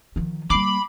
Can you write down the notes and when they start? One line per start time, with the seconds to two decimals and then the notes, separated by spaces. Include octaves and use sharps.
0.16 D#3 F3
0.50 G3 A#3 B5 D6 C7